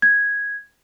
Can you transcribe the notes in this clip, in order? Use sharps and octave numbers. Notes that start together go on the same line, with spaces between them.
G#6